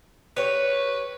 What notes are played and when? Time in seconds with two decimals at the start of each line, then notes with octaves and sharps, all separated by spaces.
0.37 G4 B4 C#5